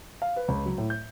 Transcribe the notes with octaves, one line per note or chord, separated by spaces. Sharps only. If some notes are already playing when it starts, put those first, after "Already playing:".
F5
B4
C#2
F#3
A2
G6